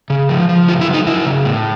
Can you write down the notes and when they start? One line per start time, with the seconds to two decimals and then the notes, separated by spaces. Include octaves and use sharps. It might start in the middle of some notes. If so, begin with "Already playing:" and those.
0.10 C#3
0.29 F3
0.49 F3
0.68 C#3 F4
0.81 E4
0.88 F#3
0.94 D#4
1.07 F#3 E4
1.26 C#3
1.45 A2